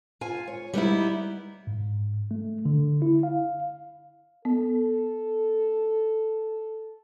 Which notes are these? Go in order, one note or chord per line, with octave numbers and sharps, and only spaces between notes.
F4 G#5
C#5
G3 B3 D#4 E4
G#2
A3
D3
E4
F5
B3 A4